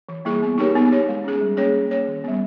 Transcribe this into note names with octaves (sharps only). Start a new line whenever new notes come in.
E3
G3 A#3 E4 G#4
B3
D#4 G4 A#4 C#5
B3
G4 C#5
G#3
C#4 G#4
G3
A#3 C#4 G#4 C#5
C#4
G#4 C#5
D#3
G3 B3